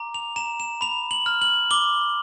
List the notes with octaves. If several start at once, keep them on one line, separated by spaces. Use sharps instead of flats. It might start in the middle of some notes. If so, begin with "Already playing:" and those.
Already playing: A#5 D6
F7
A#5 E7
E7
B5 F7
F#7
F6
F#7
D6 G7